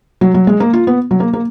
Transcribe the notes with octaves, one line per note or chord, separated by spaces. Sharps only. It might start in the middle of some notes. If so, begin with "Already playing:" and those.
F#3
F#3
G#3
A#3
F4
B3
F#3
A#3
A#3